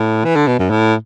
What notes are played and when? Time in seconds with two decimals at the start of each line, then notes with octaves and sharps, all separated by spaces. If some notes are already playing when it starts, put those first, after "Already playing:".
Already playing: A2
0.25 E3
0.35 D3
0.47 B2
0.59 F#2
0.70 A2